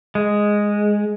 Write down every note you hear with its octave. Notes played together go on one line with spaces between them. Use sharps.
G#3